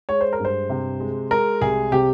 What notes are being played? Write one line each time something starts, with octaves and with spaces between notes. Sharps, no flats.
G#3 C#5
C5
A#4
G2 C5
C3
G#3
G#3 A#4
C2 G#4
C3 G4